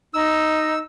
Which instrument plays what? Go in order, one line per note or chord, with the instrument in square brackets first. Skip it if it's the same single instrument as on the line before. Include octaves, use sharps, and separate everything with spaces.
[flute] D#4 [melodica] E6